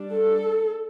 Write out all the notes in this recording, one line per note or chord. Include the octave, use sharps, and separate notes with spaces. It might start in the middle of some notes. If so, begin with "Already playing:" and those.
Already playing: G3 D4
A4